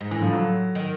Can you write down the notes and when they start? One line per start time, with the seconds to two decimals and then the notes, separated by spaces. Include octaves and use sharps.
0.01 G#2
0.11 A2 E3
0.22 F3
0.33 F#3
0.75 D#3